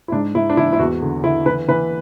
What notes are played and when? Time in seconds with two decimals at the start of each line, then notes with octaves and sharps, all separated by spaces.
0.08 E4
0.12 G#2 D4
0.35 G#2 E4
0.50 D4
0.57 E3 E4
0.73 E4
0.79 E2 F#4
1.02 D3
1.24 D3 E4
1.46 E3 B4
1.68 E3 B4